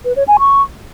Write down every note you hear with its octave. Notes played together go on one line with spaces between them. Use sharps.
B4
C#5
G#5
C#6